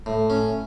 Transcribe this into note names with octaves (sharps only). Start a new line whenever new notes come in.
A2
C#4